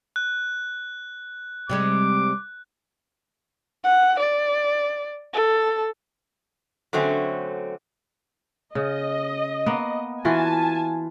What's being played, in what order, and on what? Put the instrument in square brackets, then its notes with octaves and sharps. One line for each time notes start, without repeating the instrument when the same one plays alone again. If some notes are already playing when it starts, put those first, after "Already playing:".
[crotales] F#6
[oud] C3 G3 G#3 [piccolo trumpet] D6
[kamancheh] F#5
D5
A4
[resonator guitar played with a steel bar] D3 F#3 A3 C4 C#4
[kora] C#3 [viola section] D#5
[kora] A#3 B3
[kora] E3 F4 F#4 [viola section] G#5 A5